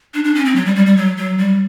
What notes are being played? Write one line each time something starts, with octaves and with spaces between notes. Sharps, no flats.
D4
D4
C#4
C4
F#3
G3
G3
G3
F#3
F#3
G3